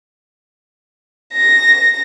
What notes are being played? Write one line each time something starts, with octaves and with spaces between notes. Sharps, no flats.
A#6